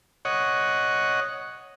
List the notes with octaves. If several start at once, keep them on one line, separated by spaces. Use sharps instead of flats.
C#5 D#5 F#5